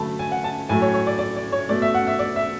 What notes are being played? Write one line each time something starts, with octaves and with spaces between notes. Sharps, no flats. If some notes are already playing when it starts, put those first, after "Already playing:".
Already playing: D3 F#3 A3 A5 B5
G#5
F#5
A5
A2 F#3 A3 G#5
C#5
C#5
D5
D5
D5
C#5
B2 A3 D5
E5
F#5
E5
D5
E5